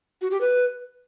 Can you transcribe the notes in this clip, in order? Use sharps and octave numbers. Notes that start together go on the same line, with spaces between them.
F#4
G4
B4